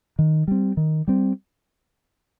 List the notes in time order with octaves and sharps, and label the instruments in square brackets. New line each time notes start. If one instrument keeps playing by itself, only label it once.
[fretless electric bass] D#3
G3 C4
D#3
G3 C4